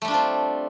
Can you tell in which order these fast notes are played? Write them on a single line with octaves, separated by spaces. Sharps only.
A3 G3 D4 F4 C4